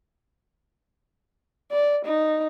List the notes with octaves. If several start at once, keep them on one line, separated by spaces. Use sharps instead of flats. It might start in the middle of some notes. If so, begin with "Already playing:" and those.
D5
D#4